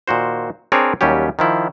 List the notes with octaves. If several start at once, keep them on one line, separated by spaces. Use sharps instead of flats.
A#2 D#3 F#4 C5
C4 D4 G#4 A#4 C#5 D5
D#2 F#3 G3 C#4 G4
D#3 F3 E4